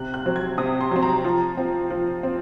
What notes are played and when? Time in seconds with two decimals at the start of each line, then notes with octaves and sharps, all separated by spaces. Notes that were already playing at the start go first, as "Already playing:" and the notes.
Already playing: C3 F#6
0.14 F#6
0.26 F#3 C4
0.36 G#6
0.58 C3 D#6
0.81 C6
0.92 F#3 C4
1.02 A#5
1.24 F3
1.57 C4
1.90 F3
2.23 C4